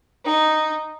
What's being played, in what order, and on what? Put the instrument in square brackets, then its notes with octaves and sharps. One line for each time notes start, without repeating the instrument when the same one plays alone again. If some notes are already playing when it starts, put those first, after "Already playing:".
[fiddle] D#4